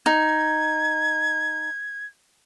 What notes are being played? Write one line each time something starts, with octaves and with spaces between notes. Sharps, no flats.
D#4 G#6